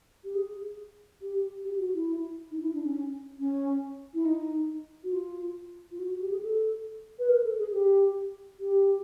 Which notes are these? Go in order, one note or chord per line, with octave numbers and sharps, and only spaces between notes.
G4
G#4
G4
G4
F#4
E4
D#4
E4
D4
C#4
C#4
E4
D#4
F#4
F4
F4
F#4
F#4
G4
G#4
A4
B4
A#4
A4
G#4
G4
G4